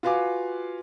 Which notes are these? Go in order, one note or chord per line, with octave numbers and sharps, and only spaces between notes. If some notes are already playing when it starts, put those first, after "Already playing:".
F4 F#4 B4 F5 G#5 D6